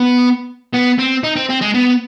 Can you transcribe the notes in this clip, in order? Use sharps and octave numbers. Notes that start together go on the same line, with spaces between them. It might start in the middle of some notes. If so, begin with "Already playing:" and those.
Already playing: B3
B3
C4
D#4
C4
C4
G#3
B3